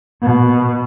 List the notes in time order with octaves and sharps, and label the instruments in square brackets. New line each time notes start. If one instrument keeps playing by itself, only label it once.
[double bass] B2